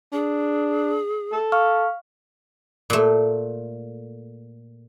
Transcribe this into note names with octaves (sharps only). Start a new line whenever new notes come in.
D4 G#4
A4
F5 C#6 F6
A#2 A3